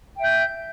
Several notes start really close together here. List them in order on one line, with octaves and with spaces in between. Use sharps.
G5 E5 G6